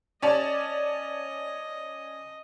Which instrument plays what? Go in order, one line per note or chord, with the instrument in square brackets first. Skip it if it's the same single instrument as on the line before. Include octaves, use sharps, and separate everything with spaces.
[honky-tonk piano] C#4 D5 A5 [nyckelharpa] D#5